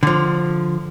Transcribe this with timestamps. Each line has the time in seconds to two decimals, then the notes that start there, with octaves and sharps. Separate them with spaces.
0.03 D3 F3